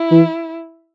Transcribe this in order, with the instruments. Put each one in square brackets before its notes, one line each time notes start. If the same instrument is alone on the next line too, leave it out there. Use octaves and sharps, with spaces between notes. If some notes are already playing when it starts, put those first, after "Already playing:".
Already playing: [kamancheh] E4
[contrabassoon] E3